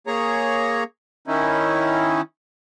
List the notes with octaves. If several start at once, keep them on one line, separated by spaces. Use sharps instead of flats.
A#3 G#4 C#5 A#5
D#3 C#4 D#4 E4